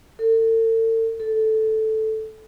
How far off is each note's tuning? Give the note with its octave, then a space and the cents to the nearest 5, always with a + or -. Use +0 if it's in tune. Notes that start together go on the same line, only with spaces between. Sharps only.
A4 +40
A4 -5